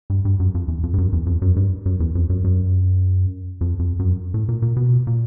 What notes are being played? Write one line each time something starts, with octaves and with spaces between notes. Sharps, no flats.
G2
G2
F#2
F2
E2
F2
G2
F#2
E2
F2
F#2
G2
F#2
E2
F2
F#2
F#2
F2
F2
F#2
A2
A#2
A#2
B2
A#2